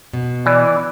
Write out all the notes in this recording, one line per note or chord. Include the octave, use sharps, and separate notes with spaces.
B2
E3 D5